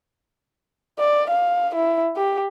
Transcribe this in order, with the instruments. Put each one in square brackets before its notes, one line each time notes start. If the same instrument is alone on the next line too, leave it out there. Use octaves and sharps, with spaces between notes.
[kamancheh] D5
F5
E4
G4